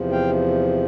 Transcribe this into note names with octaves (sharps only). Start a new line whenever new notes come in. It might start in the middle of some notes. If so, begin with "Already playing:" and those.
Already playing: E2 C3 F3
F5 G5